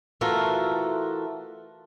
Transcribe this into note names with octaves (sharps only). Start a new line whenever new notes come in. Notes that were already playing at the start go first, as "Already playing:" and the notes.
E3 A3 F4 F#4 A4 A#4